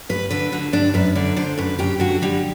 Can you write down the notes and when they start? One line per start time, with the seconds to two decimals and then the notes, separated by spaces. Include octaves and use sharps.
0.09 G2 B4
0.30 D3 B4
0.52 D3 F#4
0.73 G2 D4
0.94 F#2 B4
1.15 D3 D5
1.36 D3 C5
1.58 F#2 B4
1.79 F#2 G4
2.00 D3 F#4
2.22 D3 G3